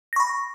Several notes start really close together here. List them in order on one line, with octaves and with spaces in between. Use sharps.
A#6 C#6 B5